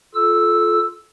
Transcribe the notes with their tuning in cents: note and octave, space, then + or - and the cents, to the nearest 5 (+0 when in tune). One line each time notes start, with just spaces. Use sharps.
F4 +0 A4 -25 E6 +0